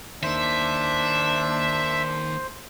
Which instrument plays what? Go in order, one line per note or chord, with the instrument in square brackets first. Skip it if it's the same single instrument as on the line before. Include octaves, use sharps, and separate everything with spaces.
[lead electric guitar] D#3 A#3 [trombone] D4 [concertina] C5 [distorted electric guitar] E5